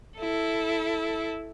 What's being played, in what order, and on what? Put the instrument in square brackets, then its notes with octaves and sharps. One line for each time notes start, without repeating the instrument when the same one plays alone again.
[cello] E4 A4